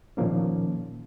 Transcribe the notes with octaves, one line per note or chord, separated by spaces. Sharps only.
A#2 D#3 F3 A#3 C#4